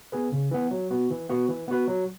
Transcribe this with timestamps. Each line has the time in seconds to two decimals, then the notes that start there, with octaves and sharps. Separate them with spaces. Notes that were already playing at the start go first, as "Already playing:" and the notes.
0.12 B3 G#4 B4
0.32 C#3
0.51 E3 B3
0.71 F#3
0.90 B3 F#4
1.10 E3
1.29 B3 F#4
1.48 E3
1.68 B3 F#4 B4
1.88 F#3